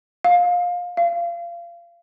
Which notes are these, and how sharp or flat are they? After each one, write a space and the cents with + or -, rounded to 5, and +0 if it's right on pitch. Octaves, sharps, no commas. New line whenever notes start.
F5 +25
F5 -25